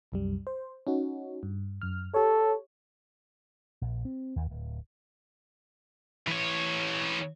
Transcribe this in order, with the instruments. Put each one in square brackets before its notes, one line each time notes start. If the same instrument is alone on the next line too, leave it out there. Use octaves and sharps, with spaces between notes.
[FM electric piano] C2 F#2 G3
C5
C#4 D#4 F#4
G2
F#2 F6
[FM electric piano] G4 C#5 [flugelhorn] A4
[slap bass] A#1
C4
D#2
D1
[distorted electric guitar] E3 C#5